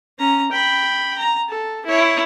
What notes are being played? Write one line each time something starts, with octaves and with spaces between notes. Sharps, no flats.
C#4 A#5
G5 B5
A#5
A4
E4 C#5